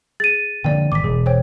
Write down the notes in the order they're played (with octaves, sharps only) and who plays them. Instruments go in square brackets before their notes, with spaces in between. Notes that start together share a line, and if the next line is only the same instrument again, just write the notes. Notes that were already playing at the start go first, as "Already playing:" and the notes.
[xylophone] G#4 [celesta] A6 D#7
[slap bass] D3 F3 A#3 [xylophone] D5 G5
[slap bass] G#1 [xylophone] D6 B6
[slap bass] E1 [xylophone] G#4
[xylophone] C5 C#5 G5